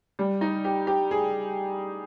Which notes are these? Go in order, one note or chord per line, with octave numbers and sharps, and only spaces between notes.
G3
D#4
G4
G4
G#4